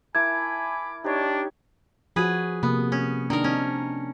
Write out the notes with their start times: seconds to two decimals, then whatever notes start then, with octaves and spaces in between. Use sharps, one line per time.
0.15 E4 A#4 G#5 A5 B5 D6 G#6
1.04 D4 D#4 G4 C#5
2.16 F3 F#4 G#4 B4
2.63 C3 A#3 B3
2.92 C#4
3.30 D#3 D4 D#4 A#4
3.44 C4 C#4